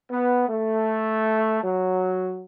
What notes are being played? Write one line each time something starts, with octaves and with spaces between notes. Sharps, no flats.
B3
A3
F#3